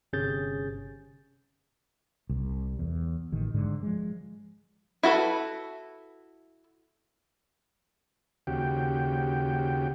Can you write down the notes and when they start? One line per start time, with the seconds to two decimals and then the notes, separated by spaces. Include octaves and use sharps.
0.13 G1 C3 C#4 G#4 G6 A6
2.30 C2
2.79 E2
3.32 A1 D#3
3.54 G#2 D3
3.83 F3 G#3
5.03 E4 F#4 A4 B4
8.47 D#2 C#3 F#4 G4 G5